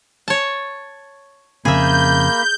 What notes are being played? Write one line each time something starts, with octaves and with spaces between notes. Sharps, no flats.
C#5 A5
F2 C#3 A#3 C4 G#4 E5 B5 G6